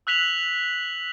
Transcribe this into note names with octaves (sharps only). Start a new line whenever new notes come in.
E6 F#6 B6 F7 F#7